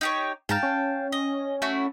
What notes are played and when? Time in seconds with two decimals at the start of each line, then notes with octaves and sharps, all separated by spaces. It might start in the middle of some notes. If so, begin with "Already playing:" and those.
0.01 D#4 G4 C#5
0.49 G#2 F5 G5 A5 A#5
0.63 C#4
1.12 D#5
1.62 A3 E4 F#4